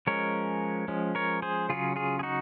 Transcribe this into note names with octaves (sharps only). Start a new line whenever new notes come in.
F3 G#3 C#4 A#4 C#5
F3 G#3 C#4
A#4 C#5
G#4 C5
C#3 F#3 C#4 F4 G#4
F4 G#4
G#4
D#4 F#4